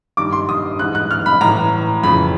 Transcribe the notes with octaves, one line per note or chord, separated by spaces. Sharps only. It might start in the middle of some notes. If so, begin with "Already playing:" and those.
G2 D#3 D6
C6
D#6
G#2 E3 F#6
F#6
F6
B5
A2 E3 A#5
F2 C#3 E3 B5